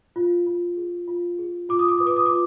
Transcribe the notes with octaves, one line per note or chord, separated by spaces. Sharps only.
F4
F4
G#4
F4
G#4
F4 D6
D#6
D6
B4 D#6
D6
D#6
D6
F4